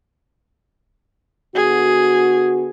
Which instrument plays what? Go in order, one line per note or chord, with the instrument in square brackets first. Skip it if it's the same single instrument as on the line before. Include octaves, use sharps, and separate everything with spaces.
[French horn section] D3 B3 F#4 [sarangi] G#4